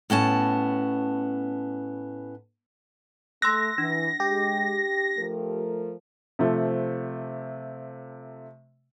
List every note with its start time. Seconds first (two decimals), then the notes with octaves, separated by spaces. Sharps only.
0.10 A2 B3 C#4 A5
3.42 A3 C6 E6 F#6 A#6
3.78 E3 D4
4.20 G#3 G4
5.17 F3 A3 A#4
6.39 C3 F3 A3